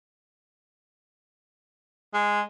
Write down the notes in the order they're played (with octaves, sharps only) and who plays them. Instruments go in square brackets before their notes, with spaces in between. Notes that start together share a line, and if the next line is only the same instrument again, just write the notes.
[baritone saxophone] G#3